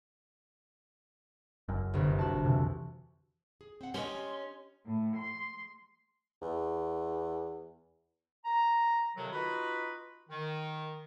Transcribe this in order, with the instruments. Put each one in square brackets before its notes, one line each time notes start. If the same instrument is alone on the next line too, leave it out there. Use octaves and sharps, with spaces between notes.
[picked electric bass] F#1 F#2
[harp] G1 C2
F#4 A5
[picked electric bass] F2 C3 E3
[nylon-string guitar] G#4
C4 F#5
[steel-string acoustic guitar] C#4 [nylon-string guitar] G4 D#5 [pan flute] C6
[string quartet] A2
C6
[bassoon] E2
[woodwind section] A#5
F2 C3 D#3 F#3
D#4 F4 F#4 B4 B5
D#3